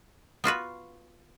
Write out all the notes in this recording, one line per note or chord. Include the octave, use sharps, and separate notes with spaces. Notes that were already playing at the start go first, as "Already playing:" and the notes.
B3 F4 F#4 B4